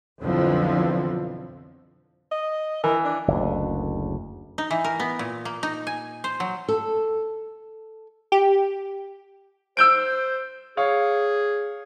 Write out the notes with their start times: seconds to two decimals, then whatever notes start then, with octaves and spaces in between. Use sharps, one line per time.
0.21 B1 F2 D3 E3 F3
2.32 D#5
2.84 E3 A#4
3.05 D4
3.28 F#1 D2
4.58 D#4
4.71 E3
4.84 A#4
5.00 B3
5.19 A#2
5.45 A#3
5.63 D#4
5.87 G#5
6.24 C5
6.40 F#3
6.68 A4
8.32 G4
9.77 C5 E6 G6 D7
10.77 G#4 C#5 F5